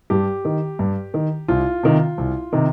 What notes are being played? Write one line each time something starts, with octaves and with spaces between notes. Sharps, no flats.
G2 G4
D#3
G2
D#3
C2 F4
C3 D#3
C2
C3 D#3